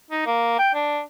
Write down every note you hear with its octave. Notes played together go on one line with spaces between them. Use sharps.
D#4
A#3
G5
D4